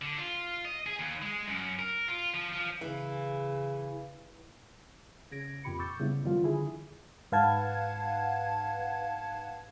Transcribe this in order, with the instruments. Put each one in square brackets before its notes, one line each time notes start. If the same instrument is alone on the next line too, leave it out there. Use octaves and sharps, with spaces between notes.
[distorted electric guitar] D3
F4
D#5
G#4
D#2
G#3
F#2
A#4
F4
F3
F3
[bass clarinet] C#3 [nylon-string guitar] E3
[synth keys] C#3 G#6 A#6 D7
F2 A#2 G4 B5 C#7
C#6 D6 E6 G6 A6 C#7
C#3 G3 B3 E4
F#2 D#3 F3 G3 B3 F4
D3 E4 G#4
[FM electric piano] G#2 B4 F5 F#5 A5 G#6